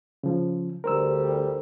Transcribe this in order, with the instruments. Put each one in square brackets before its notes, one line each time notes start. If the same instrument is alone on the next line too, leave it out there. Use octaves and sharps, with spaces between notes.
[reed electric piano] C#3 F3
[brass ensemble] D2 G3 [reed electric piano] A#4 C5 E6